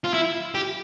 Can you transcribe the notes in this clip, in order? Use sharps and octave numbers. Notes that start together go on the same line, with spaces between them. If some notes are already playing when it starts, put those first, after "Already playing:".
F4
E4
G4